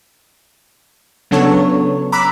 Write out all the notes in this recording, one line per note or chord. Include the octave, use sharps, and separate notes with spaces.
C#3 F#3 B3 D4 A4 C#5
A#5 B5 D6 E6 F#6 B6